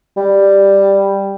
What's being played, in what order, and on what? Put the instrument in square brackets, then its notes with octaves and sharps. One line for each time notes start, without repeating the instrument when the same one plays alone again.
[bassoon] G3